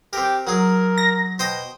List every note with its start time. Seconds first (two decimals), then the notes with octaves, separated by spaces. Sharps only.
0.13 C4 G4 A#4
0.47 F#3 G#4 A#4
0.98 A#6
1.39 B2 C5 G5 D#6